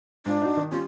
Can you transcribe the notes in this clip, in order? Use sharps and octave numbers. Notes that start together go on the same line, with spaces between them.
G#2 D4 F4
D#4 F#4
D#3
G3 C#4 F4